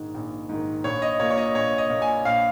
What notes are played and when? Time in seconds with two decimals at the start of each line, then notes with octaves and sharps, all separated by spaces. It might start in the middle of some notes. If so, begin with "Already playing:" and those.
Already playing: A#1 G#2 D#3
0.14 A#1
0.49 G#2 D#3
0.84 A#1 C#5
1.02 D#5
1.20 A#2 C#5
1.30 C#5
1.37 D#5
1.55 A#1 C#5
1.78 D#5
1.90 A#2
2.02 G#5
2.25 A#1 F5